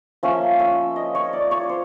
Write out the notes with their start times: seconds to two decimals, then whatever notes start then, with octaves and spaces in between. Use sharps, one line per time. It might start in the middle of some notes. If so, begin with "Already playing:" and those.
0.23 F3 A#3 C#4 E5
0.59 E5
0.96 D#5
1.15 C#5
1.33 D5
1.51 C#5
1.69 C5